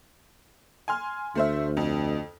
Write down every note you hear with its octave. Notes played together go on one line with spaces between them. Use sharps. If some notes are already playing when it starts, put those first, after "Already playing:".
G#5 C6 F6
D2 A3 C5 E5
F2